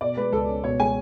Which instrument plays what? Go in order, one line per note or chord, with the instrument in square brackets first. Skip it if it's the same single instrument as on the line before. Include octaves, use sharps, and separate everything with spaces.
[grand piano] B2 [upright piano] D5
[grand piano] G#3 [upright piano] B4
[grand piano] C#2 [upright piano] A4
[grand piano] C#4
[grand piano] B2 [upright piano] C#5
[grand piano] G#3 [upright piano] G#5